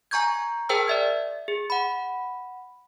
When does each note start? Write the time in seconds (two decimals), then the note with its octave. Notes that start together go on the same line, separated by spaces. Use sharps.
0.11 G#5 A#5 C#6 G6 G#6
0.69 G#4 A#4 C5 G5 A5 E6
0.88 D5 E5 G#6
1.48 G#4
1.70 F#5 B5